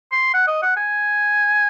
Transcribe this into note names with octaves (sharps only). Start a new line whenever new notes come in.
C6
F#5
D#5
F#5
G#5